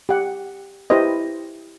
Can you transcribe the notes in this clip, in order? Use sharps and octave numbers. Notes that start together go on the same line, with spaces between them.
G4 F#5
E4 G4 B4 C5 D#5